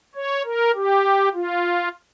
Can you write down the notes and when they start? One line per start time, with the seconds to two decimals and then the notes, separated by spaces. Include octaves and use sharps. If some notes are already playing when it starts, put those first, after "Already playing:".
0.15 C#5
0.45 A#4
0.75 G4
1.34 F4